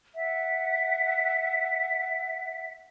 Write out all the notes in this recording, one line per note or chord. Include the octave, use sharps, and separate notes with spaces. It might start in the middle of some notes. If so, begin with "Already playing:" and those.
E5 F#5